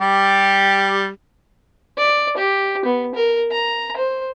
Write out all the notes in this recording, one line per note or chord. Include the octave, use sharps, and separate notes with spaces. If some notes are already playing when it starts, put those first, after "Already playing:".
G3 G4
D5
G4
B3
A#4
A#5
C5